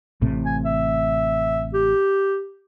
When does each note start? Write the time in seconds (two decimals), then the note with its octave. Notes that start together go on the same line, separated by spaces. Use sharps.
0.22 A1 A2 C3
0.45 G#5
0.65 E5
1.74 G4